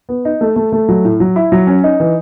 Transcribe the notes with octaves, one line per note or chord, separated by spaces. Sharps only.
B3
D#4
A3
A3
A3
F#3
A2
F#3
E4
F#3
C#4
D#4
E3